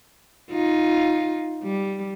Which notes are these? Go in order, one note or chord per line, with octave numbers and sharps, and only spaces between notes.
D#4 F4
G3